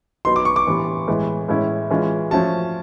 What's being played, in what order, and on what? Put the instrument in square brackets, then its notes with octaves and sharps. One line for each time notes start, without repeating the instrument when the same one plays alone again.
[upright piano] F#3 B3 D#4 [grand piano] C6
[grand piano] D6
C#6
D6
[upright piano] A2 E3 G3 B3
A2 E3 G#3 B3
A2 E3 G#3 C#4 E4
E3 G#3 C#4 F4
[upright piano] F3 A3 C#4 F#4 [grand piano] A5